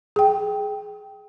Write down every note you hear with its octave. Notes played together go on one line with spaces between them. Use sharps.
G#4 G5